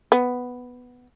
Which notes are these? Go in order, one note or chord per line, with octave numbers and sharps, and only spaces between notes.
B3